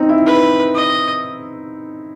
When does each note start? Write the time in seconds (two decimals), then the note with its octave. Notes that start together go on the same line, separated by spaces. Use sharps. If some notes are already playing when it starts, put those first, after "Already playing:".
Already playing: C4 D#4
0.09 E4
0.26 B4
0.75 D#5